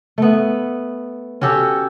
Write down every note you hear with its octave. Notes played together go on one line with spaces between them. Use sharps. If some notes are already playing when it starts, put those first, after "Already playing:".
A3 B3
C#4 F#4 G4 A4